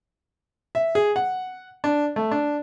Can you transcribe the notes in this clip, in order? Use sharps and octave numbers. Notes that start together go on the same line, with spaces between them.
E5
G#4
F#5
D4
A3
D4